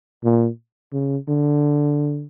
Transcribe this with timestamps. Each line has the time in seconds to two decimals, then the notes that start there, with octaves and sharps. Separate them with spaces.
0.24 A#2
0.92 C#3
1.28 D3